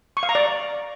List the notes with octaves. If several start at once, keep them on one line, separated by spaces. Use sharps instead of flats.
C#6
F5
A#5
D5